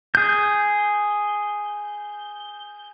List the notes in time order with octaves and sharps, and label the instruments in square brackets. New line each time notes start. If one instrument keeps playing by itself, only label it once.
[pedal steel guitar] G#4 G6